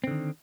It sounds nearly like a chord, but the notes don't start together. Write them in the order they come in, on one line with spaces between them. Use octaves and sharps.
C4 D3 D#3